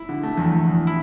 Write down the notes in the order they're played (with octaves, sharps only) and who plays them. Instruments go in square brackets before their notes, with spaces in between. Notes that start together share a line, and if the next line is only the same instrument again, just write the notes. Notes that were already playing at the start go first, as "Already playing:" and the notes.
Already playing: [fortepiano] E4
D3
A3
E2
E2
E2
E4